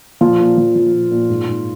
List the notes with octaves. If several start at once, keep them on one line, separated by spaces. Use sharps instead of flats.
A#2 F3 F4
A#2
F3
F3
A#2
A#2
G#2
G#2